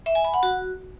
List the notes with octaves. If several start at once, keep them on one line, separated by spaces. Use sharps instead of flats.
E5
G#5
B5
F#5
F#4